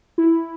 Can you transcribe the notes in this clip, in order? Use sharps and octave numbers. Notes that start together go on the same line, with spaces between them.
E4